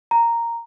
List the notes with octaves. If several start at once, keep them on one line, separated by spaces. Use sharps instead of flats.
A#5